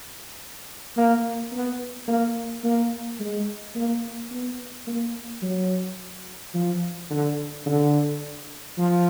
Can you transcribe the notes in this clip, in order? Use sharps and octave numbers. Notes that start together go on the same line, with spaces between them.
A#3
B3
A#3
A#3
G#3
A#3
B3
A#3
F#3
F3
D3
D3
F3